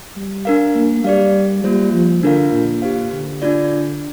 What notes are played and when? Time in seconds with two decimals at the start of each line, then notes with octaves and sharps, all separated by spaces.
0.16 G3
0.45 D4 A#4 F5
0.75 A#3
1.04 G3 G4 D5 F5
1.64 G3 A#3 F4 C5
1.93 F3
2.23 D3 D4 F4 A#4 F5
2.52 A#2
2.82 G4 C5 F5
3.12 D3
3.42 D4 F4 D5